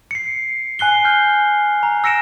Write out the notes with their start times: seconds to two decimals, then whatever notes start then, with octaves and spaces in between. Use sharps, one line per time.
0.11 C7 C#7
0.79 G#5 F#6 C7 G7
1.05 F6 G6
1.83 A#5
2.04 E6 A#6 C#7 D7 E7